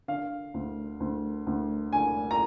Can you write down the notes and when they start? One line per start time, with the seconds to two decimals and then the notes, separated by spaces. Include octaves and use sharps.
0.08 D3 F5
0.54 D2
1.00 D2
1.47 D2
1.93 D3 G#5
2.31 A#5